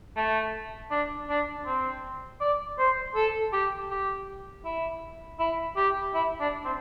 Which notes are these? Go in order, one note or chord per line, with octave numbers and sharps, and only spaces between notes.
A3
D4
D4
C4
D5
C5
A4
G4
G4
E4
E4
G4
E4
D4
C4